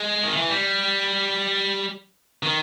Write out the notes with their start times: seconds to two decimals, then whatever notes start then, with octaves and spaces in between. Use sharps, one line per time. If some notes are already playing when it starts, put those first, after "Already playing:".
Already playing: G#3
0.24 D#3
0.37 E3
0.50 G3
2.43 D#3